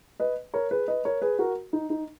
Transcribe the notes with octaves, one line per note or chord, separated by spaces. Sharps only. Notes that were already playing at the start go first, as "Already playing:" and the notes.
B4 D#5
A#4 C#5
G#4 B4
B4 D#5
A#4 C#5
G#4 B4
F#4 A#4
D#4
D#4